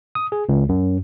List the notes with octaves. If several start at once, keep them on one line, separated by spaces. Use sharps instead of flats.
D#6
G#4
C#2
F#2